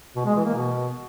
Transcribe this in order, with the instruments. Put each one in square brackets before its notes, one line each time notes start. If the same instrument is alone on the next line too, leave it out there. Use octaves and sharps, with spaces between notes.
[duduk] B2
G#3
E3
A#3
B2